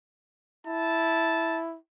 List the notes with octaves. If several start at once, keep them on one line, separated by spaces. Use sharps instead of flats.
E4 A5